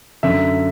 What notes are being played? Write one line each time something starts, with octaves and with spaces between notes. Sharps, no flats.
F#2 D3 E5